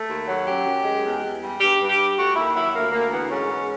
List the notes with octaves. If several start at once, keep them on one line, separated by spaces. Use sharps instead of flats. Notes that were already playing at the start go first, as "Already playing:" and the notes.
Already playing: A3
D#2
F#3
F#2 G4
F#2
G#3
E2
E2
G3
G2 G4
G2
G4
G3
A3 F#4
D#2 E4
F#3 E4
D2 A#3
D2 A#3
E3 B3
G#2 C#4
G#2